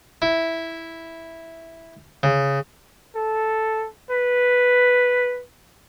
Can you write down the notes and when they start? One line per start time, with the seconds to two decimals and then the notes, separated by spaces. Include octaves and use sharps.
0.22 E4
2.23 C#3
3.15 A4
4.10 B4